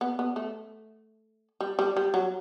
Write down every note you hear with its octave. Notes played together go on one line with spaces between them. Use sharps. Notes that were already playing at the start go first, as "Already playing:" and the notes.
B3
B3
A3
G3
G3
G3
F#3